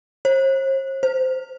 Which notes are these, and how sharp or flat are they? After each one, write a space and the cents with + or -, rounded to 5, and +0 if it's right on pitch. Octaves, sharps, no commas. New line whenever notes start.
C5 +45
C5 -15